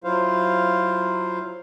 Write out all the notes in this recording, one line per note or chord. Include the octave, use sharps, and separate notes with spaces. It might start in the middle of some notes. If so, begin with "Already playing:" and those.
F#3 E4 F4 C5 F5